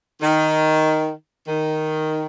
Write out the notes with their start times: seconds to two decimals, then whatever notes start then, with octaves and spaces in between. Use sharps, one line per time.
0.21 D#3
1.48 D#3